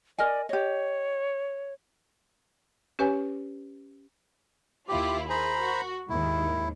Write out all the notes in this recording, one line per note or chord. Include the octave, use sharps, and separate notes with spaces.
A#4 D5 D#5 G#5
G4 C#5 D#5
C#4 G4 B4 C#5 G#5
D#2 E4 F4 G4
G#4 A#4 C5 A#5 B5
F#4
D#2 G#2 D#3 E4